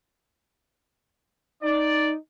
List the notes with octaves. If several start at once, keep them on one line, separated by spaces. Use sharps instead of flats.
D#4 D5